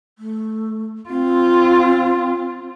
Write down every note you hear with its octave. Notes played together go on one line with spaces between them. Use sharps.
A3
C4 F4